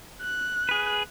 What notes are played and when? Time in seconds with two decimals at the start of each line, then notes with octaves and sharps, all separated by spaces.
0.22 F#6
0.69 G#4 B4